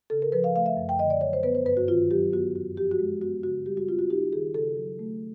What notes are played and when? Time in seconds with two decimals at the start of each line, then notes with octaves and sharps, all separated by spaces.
0.10 C#3 A4
0.22 A#4
0.32 F3 B4
0.44 F5
0.56 A3 F5
0.66 E5
0.77 F#2
0.89 G5
0.99 D3 D#5
1.10 D5
1.21 F#3 C#5
1.33 C5
1.43 B3 B4
1.55 C5
1.65 G2 B4
1.77 F#4
1.88 D#3 F4
2.11 F#3 G4
2.32 B3 F#4
2.55 F#2 F#4
2.77 F3 G4
2.91 F#4
2.99 G#3
3.21 B3 F#4
3.43 C#3 F#4
3.66 G3 G4
3.77 F#4
3.89 C4 F4
3.99 F#4
4.10 D#4 G4
4.33 D#3 G#4
4.54 C#3 A4
4.77 F#3
4.99 A3